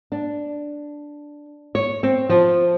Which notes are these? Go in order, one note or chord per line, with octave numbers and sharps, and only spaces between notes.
D4
C#5
C4
F3